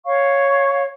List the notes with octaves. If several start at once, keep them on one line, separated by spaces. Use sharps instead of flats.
C#5 F5 C#6